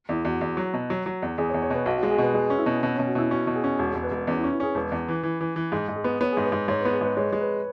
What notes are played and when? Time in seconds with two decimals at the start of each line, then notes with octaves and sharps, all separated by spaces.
0.09 E2 E4
0.25 E2 F#4
0.41 E2
0.57 F#3
0.74 B2
0.90 F#3
1.06 F#3
1.22 E2
1.38 E2 G#4
1.50 C#5
1.54 E2
1.62 C#5
1.70 B2 B4
1.86 B1 F#4
1.98 F#4
2.03 G#3
2.11 G#4
2.18 B2 B4
2.34 G#3 G#4
2.50 C#4
2.59 E4
2.66 B2
2.83 B2 C#4
2.95 C#4
2.99 B2
3.07 F#4
3.15 B2 E4
3.31 C#4 F#4
3.47 B2
3.55 G#4
3.64 C#4
3.79 E1 F#4
3.91 G#4
3.95 E1
4.03 B4
4.11 E1 G#4
4.27 E2 C#4
4.39 E4
4.44 C#4
4.51 E4
4.60 C#4 G#4
4.75 E1 B4
4.92 E2
5.08 E3
5.23 E3
5.41 E3
5.56 E3
5.72 G#2 G#4
5.88 G#2
5.96 G#4
6.04 B3
6.21 B3 C#5
6.32 G#2 G#4
6.45 B4
6.52 G#2
6.68 G#2 C#5
6.81 B4
6.85 B3
6.93 G#4
7.01 G#2 B4
7.17 G#3 C#5
7.33 G#3
7.41 B4